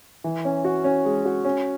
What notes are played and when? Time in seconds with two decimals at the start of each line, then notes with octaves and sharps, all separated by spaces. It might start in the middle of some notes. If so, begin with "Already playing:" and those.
0.24 E3
0.45 C#4
0.65 F#4
0.84 C#4
1.05 G#3
1.25 F#4
1.45 C#4